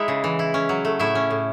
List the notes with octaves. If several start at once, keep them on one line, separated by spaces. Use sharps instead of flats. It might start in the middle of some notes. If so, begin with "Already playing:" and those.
Already playing: G#3 D#4 E4 E5
C#3
E3
E4
C#4
F#3
A3
A2 E4 E5
C#4
A2